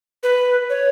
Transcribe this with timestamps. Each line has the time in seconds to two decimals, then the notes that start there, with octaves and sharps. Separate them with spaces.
0.23 B4
0.70 C#5